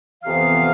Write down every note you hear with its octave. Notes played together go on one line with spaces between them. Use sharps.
F2 C3 E3 B3 F5